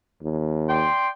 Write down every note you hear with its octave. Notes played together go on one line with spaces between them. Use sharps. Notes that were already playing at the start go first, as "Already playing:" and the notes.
D#2
D5 G5 C6